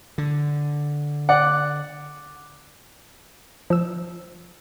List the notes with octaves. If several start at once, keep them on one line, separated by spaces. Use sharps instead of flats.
D3
D5 F#5
F3 E6